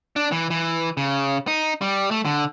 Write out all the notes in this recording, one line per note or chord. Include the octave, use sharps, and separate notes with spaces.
D4
E3
E3
C#3
D#4
G3
A3
D3